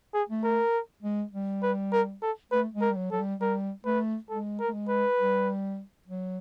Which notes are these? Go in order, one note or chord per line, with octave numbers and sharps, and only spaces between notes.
G#4
A3
A#4
G#3
G3
B4
A#4
A4
A3 B4
G#3
A#4
G3
F#3
F#3 A4
G3
G3 A#4
A3 B4
G#3 A4
A#4
A3
G#3
B4
G3
F#3